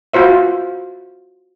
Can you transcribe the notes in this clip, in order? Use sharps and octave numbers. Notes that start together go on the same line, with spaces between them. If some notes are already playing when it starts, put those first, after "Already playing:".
F4 F#4 C5 E5